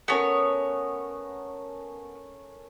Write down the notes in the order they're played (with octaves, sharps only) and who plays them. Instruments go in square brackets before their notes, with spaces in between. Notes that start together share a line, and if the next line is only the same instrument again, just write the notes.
[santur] A3 C#4 A#4 [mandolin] B3 C#5